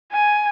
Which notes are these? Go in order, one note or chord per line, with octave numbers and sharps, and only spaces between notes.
G#5